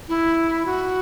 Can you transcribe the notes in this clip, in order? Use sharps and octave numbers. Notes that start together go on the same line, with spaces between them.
E4
F#4